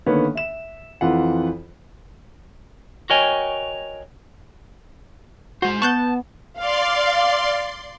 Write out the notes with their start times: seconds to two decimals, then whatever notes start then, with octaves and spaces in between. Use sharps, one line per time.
0.06 D3 D#3 A#3 B3 C#5
0.35 E5 E7
1.01 F2 E3 F4 F#5
3.10 F#4 A#4 C#5 D#5 G5 G#5
5.62 G#3 F#4 C5
5.82 B3 A5 C#6 F#6 G6
6.58 D5 F5 C6